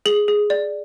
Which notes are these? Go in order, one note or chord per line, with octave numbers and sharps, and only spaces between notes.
G#4 F#7
G#4
D5